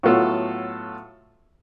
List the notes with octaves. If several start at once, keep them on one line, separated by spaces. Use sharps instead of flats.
A2 F#3 B3 F4 A4